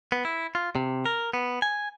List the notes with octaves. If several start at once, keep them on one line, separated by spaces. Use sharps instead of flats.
B3
E4
F4
C3
A#4
B3
G#5